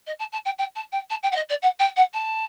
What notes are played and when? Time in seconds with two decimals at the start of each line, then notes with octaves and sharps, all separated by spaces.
0.06 D#5
0.19 A5
0.32 A5
0.45 G5
0.58 G5
0.75 A5
0.92 G5
1.10 A5
1.23 G5
1.31 F#5
1.35 D#5
1.49 D5
1.62 F#5
1.79 G5
1.96 F#5
2.13 A5